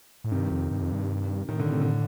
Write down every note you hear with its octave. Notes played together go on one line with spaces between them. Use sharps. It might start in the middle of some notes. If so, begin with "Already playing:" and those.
A2
G2 C3 D#3
F2
G2
F2
G2
A2 D#3
D3
C3
D3